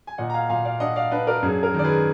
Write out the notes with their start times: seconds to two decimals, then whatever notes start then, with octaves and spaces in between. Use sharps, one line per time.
0.07 G#5
0.18 A#2 D#5 F#5
0.30 A#5
0.34 F5 G#5
0.49 A#2 F5 G#5
0.65 D5 F5
0.80 D4 D#5 F#5
0.96 D5 F5
1.11 D4 B4 D#5
1.27 A#4 D5
1.43 F#2 G#4
1.63 A#4
1.74 D#3 D5
1.84 G#4 B4